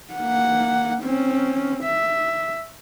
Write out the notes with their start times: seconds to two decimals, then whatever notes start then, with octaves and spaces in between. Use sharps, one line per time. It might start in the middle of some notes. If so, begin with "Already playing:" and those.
0.14 A#3 F#5
1.02 C4 C#4
1.84 E5